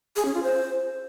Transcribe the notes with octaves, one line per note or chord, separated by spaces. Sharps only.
G#4
C#4
F4
C5